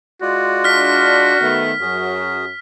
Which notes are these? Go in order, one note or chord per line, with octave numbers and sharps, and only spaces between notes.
G#3 F4 F#4 D5
D4 F6 B6
D#3 A3 B3
F#2 F#3 F#4 G#4